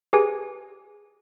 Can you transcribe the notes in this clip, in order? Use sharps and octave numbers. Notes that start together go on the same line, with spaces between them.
G4 G#4 B4 G#5